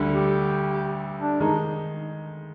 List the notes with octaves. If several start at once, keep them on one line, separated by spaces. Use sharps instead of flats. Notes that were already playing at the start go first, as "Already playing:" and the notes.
Already playing: D2 D3 G3
G4
D4
D#3 G#3 D#4